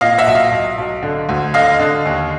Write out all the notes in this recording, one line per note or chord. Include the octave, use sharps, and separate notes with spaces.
A#2 D#5 F5
E5 F#5
B1
D#5 F5
B1
B1
D3
D2
D3 D#5 F5
D3
D#2